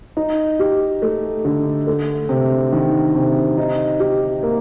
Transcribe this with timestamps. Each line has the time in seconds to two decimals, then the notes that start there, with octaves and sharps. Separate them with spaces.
0.17 D#4
0.59 G4
1.02 A3
1.45 D3
1.87 A3
2.29 C3
2.72 D#3
3.15 C3
3.58 D#4
4.00 G4
4.43 A#3